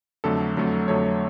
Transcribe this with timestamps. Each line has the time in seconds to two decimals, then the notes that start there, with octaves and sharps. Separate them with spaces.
0.24 F2 D3 F#3 A3 A4
0.57 F2 D3 F#3 A3
0.88 F2 D3 F#3 A3 C#5